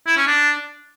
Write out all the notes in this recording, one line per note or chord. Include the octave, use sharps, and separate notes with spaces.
E4
C#4
D4